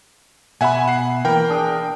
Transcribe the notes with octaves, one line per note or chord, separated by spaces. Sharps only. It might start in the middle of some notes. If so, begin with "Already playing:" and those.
B2 E5 F#5 G#5 B5
F#5 C7
E3 A#3 A#4 G5
D4 G#4